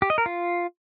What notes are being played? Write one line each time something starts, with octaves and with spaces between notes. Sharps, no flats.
G4
D#5
A#4
F4